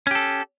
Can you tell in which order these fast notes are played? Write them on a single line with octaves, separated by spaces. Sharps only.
C#4 G4 A4